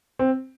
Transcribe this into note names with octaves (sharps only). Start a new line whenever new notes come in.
C4